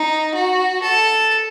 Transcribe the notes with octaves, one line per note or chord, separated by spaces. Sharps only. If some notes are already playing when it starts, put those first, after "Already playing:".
Already playing: D#4
F#4
A4